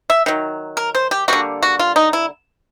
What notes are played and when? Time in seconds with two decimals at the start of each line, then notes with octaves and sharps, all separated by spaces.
0.10 E5
0.26 D#3 F#3
0.77 A#4
0.95 C5
1.11 G4
1.28 D3 G3 A#3 F#4
1.63 F#4
1.79 F4
1.96 D#4
2.13 E4